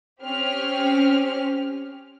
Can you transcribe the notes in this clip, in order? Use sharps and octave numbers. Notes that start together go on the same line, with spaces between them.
C4 C#4 G4 F6